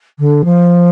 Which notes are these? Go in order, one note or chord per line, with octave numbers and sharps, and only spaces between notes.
D3
F3